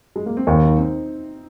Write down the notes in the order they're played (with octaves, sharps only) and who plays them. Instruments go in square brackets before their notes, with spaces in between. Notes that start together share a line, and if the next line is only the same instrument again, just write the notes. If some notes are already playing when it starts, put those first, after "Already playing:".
[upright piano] G#3
A#3
C4
[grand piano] D#2 [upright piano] D#4
[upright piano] D#4
C4